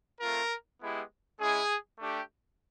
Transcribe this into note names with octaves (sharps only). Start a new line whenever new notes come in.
A3 C4 F4 A#4
G#3 B3 E4 G4
G#3 C#4 E4 G#4
A3 D4 G4